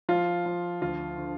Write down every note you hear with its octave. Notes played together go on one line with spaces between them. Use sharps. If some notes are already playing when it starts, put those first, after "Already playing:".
F3 F4
F3
D2 F4
D3